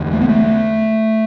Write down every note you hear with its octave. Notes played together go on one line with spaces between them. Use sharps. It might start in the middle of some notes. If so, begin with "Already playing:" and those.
Already playing: E2 D3
A3
B3
A3